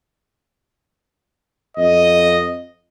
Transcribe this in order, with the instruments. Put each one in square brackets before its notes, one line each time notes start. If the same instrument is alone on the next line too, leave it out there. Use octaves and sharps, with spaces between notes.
[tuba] F2 [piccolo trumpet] D#5